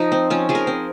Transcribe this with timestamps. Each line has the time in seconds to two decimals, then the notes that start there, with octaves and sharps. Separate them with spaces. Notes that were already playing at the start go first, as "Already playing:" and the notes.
Already playing: F3 D#4
0.12 C4
0.30 F3 C#4
0.49 F3 G#4
0.55 A#4
0.67 C4